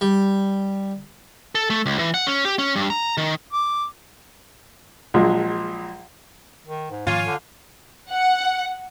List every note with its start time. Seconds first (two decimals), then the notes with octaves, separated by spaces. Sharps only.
0.01 G3
1.55 A4
1.70 A3
1.86 C#2
1.99 E3
2.14 F#5
2.27 C#4
2.45 G4
2.58 C#4
2.76 G2
2.90 A#5
3.18 D#3
3.52 D6
5.14 A#1 A#2 F3 F#3 G#3
6.67 D#3
6.91 G#2
7.07 G#2 D#3 F3 A#3 F4 C#5 F5 G#5
7.26 D3
8.10 F#5